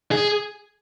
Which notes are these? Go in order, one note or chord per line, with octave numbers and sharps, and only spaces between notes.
G#4